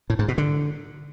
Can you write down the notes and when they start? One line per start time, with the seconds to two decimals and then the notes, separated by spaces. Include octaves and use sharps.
0.10 A2
0.19 G#2
0.28 B2
0.38 D3